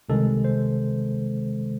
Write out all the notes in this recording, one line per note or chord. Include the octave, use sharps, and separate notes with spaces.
C2 C3 D#3 G#3 A4
C5